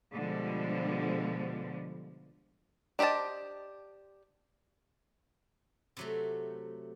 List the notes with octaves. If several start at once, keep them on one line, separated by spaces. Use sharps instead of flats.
B2 D3 F3 G3 G#3
D4 G4 C5 D#5 A5
C3 F#3 A3